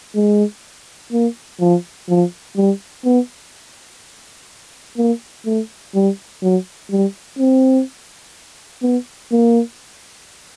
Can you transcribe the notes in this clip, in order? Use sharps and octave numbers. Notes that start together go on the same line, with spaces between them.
G#3
A#3
F3
F3
G3
B3
A#3
A3
G3
F#3
G3
C4
B3
A#3